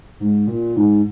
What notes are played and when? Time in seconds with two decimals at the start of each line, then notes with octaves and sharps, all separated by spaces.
0.20 G#2
0.47 A#2
0.76 G#2